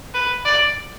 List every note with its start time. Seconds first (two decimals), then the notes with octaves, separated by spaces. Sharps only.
0.14 B4
0.46 D5